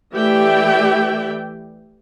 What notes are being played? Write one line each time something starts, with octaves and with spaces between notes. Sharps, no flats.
E3 A3 G4 D5 E5 G5